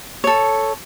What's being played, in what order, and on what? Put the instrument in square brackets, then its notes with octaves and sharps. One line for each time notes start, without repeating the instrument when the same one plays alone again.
[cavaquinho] A4 C#5